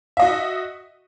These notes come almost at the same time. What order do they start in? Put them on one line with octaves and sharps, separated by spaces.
E5 D#5 F#4